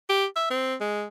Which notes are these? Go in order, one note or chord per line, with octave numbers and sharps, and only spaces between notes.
G4
E5
C4
G#3